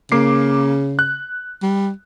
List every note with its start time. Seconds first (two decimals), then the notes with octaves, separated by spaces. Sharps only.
0.12 C#3 A#3 D6 C7
0.99 F#6
1.63 G3